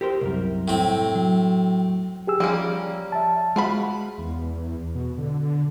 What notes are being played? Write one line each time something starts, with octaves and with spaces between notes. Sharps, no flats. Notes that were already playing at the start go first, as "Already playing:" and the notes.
G4 A#4 C5
C2 F#2 A#4
A2 C4
F#3
G4 G#4 E6
F3 G3 A#3 C#4
E5 A5
G#3 F4 F#4 B5
E2
B2
D3